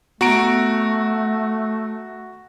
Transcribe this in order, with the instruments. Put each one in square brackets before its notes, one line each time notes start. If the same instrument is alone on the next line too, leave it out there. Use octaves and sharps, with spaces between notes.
[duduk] A3 [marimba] B3 [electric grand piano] F#4 A#5 D7